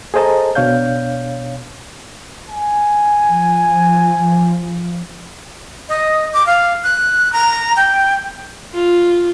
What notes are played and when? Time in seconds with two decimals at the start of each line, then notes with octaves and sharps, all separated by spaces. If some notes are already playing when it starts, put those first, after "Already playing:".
0.14 G#4 A4 C5 D#5 A5 A#5
0.55 B2 D4 C#5 F5 G6
2.50 G#5
3.24 F3
5.89 D#5
6.34 D6
6.46 F5
6.84 F#6
7.33 A#5
7.76 G5
8.74 F4